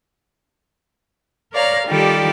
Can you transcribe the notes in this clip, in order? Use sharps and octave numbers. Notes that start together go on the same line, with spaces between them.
A#4 C#5 D5 F5 A#5
D#3 G3 F4 G4 A4 D5